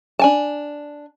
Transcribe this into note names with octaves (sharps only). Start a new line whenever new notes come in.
D4 G#5 A5